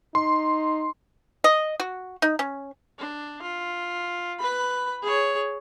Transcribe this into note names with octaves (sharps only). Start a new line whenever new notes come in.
D#4 C6
D#5
F#4
D#4
C#4
D4
F4
B4 B5
G#4 C#5